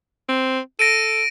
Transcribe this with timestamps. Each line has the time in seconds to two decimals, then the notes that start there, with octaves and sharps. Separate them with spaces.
0.29 C4
0.79 A4 A#6 D7 D#7